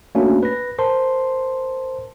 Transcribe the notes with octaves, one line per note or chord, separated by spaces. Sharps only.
A3 A#3 C#4 D4 F#4
B4 A#6
A#4 C5 A5 C6